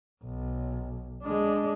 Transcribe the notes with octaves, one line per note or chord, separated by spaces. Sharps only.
B1
G#3 D4